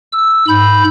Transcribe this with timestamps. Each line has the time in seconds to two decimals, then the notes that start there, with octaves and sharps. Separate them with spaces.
0.13 E6
0.48 G#2 B5 G6